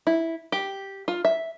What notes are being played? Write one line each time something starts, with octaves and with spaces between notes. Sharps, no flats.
E4
G4
F4
E5